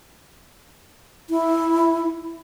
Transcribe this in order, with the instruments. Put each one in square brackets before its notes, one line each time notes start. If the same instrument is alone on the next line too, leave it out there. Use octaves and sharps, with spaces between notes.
[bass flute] E4